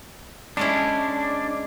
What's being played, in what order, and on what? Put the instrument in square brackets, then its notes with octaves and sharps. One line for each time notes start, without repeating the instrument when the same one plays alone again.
[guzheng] G#3 C#4 E4 [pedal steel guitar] D4